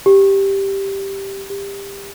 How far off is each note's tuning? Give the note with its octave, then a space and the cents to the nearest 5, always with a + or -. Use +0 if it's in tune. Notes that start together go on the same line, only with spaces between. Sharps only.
G4 +0
G4 +25